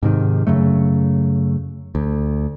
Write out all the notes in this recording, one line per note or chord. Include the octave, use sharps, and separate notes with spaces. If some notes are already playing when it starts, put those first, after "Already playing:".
G#2 C3 D#3
F#2 C#3 F#3 A3
D2